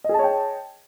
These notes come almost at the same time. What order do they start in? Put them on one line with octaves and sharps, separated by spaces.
D#5 G#4 A5 C#5 G5